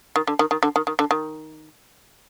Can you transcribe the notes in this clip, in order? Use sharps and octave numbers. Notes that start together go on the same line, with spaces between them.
D#3
D3
D#3
D#3
D3
D#3
D#3
D3
D#3